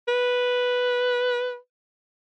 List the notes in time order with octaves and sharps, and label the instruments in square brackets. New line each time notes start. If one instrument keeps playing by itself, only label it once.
[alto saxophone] B4